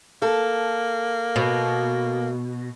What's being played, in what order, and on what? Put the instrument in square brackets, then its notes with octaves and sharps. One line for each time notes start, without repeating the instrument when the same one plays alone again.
[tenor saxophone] A#3 [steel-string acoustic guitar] A4
[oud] B2